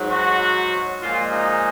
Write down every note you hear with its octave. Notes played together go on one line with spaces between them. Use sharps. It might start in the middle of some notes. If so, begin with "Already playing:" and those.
Already playing: G#2 F#3
F#4
A#2 F3 G#3 F4
D#4